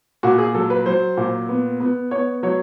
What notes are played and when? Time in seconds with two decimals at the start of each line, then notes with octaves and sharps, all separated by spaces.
0.23 A#2 F#4
0.38 G#4
0.54 F#3 A4
0.70 B4
0.86 F#3 C5
1.17 A#2
1.49 B3
1.80 B3
2.11 B3 C#5
2.43 F#3 C#5